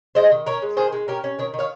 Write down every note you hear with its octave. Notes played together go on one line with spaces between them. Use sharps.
G#3 C5 D#5
D#3
C#4 A#4 C#5
G#3
D#3 G#4 C5
G#3
C#4 G4 A#4
C#4
D#3 A#4 C#5
D#3
C#5 F5